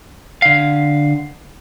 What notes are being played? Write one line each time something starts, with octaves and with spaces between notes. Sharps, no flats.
D3 F5